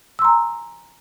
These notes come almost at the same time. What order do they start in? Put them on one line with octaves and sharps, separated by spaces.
E6 C6 A#5 G#5